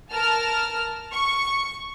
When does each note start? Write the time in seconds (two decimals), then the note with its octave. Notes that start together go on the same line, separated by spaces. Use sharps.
0.12 A#4 A5 F6
1.13 C#6